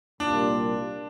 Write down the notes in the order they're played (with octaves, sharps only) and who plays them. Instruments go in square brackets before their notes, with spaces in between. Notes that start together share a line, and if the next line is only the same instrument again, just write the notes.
[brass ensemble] C2 A#2 G3 A#3 F4 [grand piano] D4